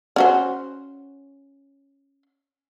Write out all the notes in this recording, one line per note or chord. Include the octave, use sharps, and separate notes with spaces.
C#4 F#4 C5